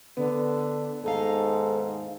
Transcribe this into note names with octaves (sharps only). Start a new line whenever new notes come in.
D3 B3
D#2 G#2 D#4 A4 F5